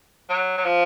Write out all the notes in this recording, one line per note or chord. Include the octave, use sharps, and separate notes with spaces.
F#3
F#3
F3